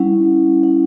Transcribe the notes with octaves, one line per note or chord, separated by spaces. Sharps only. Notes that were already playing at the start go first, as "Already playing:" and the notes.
Already playing: G3 C#4 E4 F#5
F#5